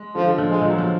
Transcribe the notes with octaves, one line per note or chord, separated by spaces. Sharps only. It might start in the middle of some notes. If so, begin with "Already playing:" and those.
Already playing: G#3
D3 F3
D3
F3
G#3
F3
F#3
F3